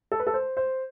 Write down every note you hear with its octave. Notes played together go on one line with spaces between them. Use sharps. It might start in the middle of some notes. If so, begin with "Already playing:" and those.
A4
B4
A4
C5
C5